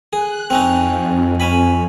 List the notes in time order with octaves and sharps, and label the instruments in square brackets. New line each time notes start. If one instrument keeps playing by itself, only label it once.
[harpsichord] G#4 [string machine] F#6
[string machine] F2 [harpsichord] C4 C#4 D#4
[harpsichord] C#4 G#5 B5